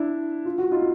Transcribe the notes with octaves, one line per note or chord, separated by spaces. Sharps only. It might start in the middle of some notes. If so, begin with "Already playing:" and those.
Already playing: D4 E4
F4
F#4
D#4 F4